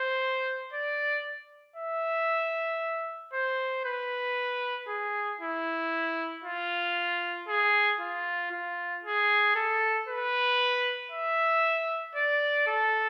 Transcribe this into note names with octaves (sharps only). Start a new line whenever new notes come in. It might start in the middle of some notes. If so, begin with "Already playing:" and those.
Already playing: C5
D5
E5
C5
B4
G#4
E4
F4
G#4
F4
F4
G#4
A4
B4
E5
D5
A4